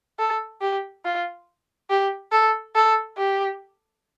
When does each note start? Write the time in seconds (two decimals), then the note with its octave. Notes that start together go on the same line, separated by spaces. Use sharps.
0.19 A4
0.61 G4
1.05 F4
1.90 G4
2.32 A4
2.75 A4
3.17 G4